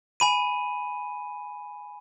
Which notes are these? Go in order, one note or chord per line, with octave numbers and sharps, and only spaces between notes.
G#5 B5 D#7